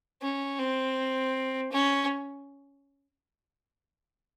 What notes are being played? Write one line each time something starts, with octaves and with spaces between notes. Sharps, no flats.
C#4
C4
C#4